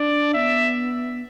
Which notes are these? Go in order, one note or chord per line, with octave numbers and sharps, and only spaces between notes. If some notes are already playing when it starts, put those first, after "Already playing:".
Already playing: D4 D5
B3 E5